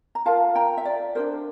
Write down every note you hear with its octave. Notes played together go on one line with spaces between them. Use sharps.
A#5
F4 A#4 F5 A5
G5 A#5
E5
D5
D4 G4 A#4 C5